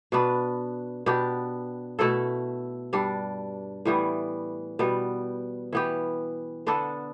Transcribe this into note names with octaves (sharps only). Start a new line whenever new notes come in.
B2 B3 D4 B4
B2 B3 D4 G4
B2 A3 E4 A4
G2 G3 D4
A2 E3 G3 B3
B2 G3 B3
E3 B3 G4
D3 B3 D4 A4